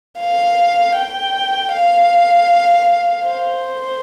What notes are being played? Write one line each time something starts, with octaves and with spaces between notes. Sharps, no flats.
F5
G5
F5
C5